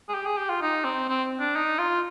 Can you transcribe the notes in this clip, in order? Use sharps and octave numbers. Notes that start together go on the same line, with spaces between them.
G#4
G4
G#4
G4
F4
D#4
C4
C4
D4
D#4
F4